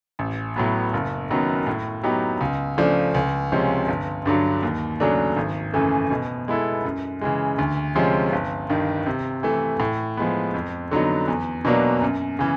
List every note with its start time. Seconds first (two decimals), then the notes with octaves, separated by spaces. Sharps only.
0.19 A1
0.56 A2 F#3 B3
0.93 F#1
1.30 F#2 D#3 F#3 B3
1.67 A2
2.03 F#3 B3 D#4 G4
2.41 C#2
2.77 C#3 F3 A3 D4
3.14 C#2
3.52 C3 F3 G#3 C#4
3.88 G1
4.26 G2 D3 F#3
4.63 D#2
5.00 C#3 F#3 A3 D4
5.36 G#1
5.74 F#2 C#3 E3 A3
6.10 B2
6.48 G#3 B3 E4 A4
6.85 F#2
7.21 C#3 E3 G#3
7.58 D2
7.95 C3 F3 G#3 C#4
8.33 G1
8.70 G2 D#3
9.06 C3
9.43 E3 A3
9.80 A2
10.17 F3 G#3 B3
10.54 F2
10.91 D3 F#3 B3 D#4
11.28 E2
11.65 B2 F#3 A#3 D4
12.02 F#2
12.39 C#3 E3